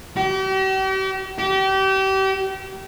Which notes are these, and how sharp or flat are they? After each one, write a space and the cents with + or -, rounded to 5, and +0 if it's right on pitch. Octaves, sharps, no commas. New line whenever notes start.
G4 -40
G4 -30